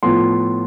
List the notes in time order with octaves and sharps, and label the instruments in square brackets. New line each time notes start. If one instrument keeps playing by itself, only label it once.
[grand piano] A2 F3 B3 F4 C6